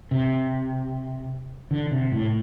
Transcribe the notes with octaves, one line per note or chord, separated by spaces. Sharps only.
C3
D3
C3
A2